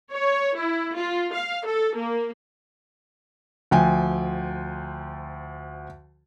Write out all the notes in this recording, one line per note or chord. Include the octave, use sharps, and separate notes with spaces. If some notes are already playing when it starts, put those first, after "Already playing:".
C#5
E4
F4
F5
A4
A#3
D2 F3 G5 G#5